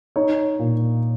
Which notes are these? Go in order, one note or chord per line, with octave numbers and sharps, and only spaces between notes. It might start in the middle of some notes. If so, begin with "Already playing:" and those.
D#4 C#5
A#2